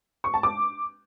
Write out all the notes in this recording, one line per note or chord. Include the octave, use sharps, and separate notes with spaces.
C#6
A5
D6